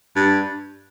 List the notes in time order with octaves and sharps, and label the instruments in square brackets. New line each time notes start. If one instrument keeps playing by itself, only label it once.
[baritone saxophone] G2